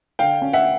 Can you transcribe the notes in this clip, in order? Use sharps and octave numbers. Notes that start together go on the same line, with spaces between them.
D3 F5 G5
C#4
E5 F#5